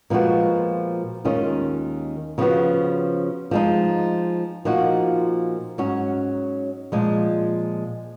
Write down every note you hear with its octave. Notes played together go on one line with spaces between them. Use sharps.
A#2 F3 G#3 B3 F#4
D#2 D#3 G#3 C#4 F4
C#3 F3 B3 F#4
F3 G#3 D#4
A#2 F3 A#3 D#4 F#4
G#2 F#3 C#4 F#4 C#5
A#2 F3 G#3